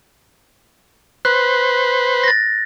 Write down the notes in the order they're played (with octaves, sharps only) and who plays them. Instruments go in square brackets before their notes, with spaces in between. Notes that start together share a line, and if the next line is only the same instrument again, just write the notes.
[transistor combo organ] B4 C5 [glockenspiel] F#6
[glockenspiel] A6 A#6